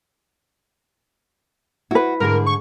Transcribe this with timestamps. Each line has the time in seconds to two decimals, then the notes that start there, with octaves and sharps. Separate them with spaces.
1.91 E4 F#4 B4
2.20 G#2 D3 G#4 A#4
2.46 C#6